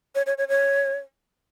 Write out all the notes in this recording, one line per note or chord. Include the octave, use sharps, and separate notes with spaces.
C#5
C#5
C#5
C#5